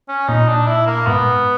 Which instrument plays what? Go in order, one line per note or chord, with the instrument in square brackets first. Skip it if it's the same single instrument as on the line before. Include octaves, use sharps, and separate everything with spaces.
[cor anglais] C#4
[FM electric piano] A#2 [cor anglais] D#4
[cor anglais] D4
E4
A#3
[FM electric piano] G#2 [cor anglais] B3